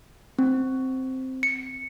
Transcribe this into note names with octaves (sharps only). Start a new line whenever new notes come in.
C4
C#7